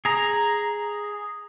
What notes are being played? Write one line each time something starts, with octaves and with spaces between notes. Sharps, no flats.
G#4 A#5